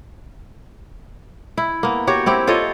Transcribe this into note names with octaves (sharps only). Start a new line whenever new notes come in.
E4
A#3 B3
F#4 G4 C#5
C4 E4 G4
F4 A4 C#5 D#5